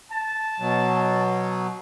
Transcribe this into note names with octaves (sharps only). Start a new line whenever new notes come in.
A5
B2 F#3